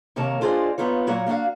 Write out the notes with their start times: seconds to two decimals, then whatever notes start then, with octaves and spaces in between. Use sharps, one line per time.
0.16 D#2 C3 A#3 A#4 C#5 A5
0.41 D4 F4 G#4 C5 D5 D#5
0.78 B3 D#4 F4 C#5
1.07 A#2 F#3 A#3 F#4 C#5 F#5
1.27 A#3 D4 D#4 F#4 F5